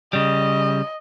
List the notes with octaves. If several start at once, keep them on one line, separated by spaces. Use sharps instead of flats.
C#3 G3 D#5